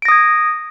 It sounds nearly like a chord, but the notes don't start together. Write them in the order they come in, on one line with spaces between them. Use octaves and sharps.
D7 A#6 D#6 G#6